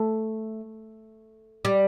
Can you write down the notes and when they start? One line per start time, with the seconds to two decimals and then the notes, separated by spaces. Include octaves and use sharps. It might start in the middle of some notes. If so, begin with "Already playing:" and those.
Already playing: A3
1.65 G3